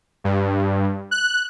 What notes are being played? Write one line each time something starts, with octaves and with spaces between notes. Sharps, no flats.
G2
F#6